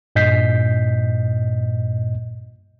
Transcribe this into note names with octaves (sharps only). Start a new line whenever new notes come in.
G2 A#2 D#5 G6 B6 C7